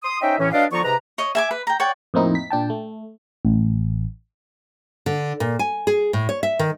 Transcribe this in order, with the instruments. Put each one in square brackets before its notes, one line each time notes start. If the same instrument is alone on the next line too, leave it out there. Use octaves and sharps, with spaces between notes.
[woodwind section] C6 D#6
C#4 D#4 C5 D#5 E5 G5
A2 E3 C#4
F#3 D4 B4 D5 D#5 F5
D3 F3 B3 F4 A#5 C#6
G#2 C3 B4 A#5
[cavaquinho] C#5 D#5
E5 G#5 D6
B4
G5 A#5
C#5 D5 F#5 G5
[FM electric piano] F2 A2 A#3 C4 D#4 E4
B6
A#2 D4 G5 A5
A3
A1
[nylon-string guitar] D3
A#2
G#5
G#4
A2
C#5
E5
D#3